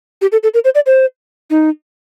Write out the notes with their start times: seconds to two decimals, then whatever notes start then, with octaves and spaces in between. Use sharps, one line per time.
0.22 G4
0.32 A4
0.43 A4
0.54 A#4
0.65 C5
0.75 D5
0.86 C5
1.50 D#4